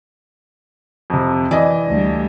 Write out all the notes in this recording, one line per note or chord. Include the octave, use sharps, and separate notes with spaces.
F2 C3
E3 D5 D#5
D2 G3